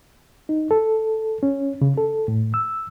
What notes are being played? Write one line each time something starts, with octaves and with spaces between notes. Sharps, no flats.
D#4
A4
C#4
C#3
A4
A2
E6